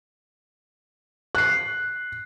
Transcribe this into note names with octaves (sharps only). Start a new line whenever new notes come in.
F#6 C7